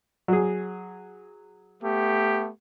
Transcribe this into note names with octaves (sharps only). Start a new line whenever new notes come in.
F#3 G#4
A3 B3 G4